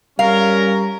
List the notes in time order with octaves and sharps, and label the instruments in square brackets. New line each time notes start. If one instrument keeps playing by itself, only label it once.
[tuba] G3 [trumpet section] C#4 A#4 [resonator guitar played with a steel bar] F5